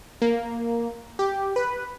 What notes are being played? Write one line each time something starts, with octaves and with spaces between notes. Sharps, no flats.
A#3
G4
B4